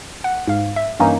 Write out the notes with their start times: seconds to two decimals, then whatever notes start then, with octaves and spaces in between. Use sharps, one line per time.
0.24 F#5
0.48 G#2 F5
0.76 E5
1.00 G2 E3 A#3 C#4 D#4